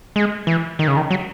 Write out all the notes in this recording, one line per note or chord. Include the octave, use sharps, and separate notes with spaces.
G#3
E3
D#3
C#3
D#3
F#3